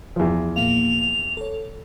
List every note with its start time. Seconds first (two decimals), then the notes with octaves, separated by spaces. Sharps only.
0.16 E2 F3
0.56 A#2 A#3 F5 F7
1.37 A4 C#5